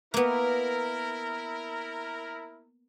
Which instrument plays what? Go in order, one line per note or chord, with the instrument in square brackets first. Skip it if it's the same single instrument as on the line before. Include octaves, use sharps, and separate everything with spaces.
[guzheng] A#3 B3 [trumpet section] E4 A#4